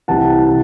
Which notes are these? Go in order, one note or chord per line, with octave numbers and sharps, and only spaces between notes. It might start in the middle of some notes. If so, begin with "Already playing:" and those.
C2 C3 E3 F#5 A5
C3 E3